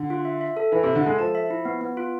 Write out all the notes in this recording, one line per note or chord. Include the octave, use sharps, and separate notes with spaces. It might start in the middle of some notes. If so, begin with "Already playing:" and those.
Already playing: D3
F4
E5
E5
A4
E3 E4
C3
E5
D3
G#3 A4
F3 A5
E5
E4
B3
B3
F4